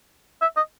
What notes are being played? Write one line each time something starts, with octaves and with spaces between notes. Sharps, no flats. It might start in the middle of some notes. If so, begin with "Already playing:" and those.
E5
D#5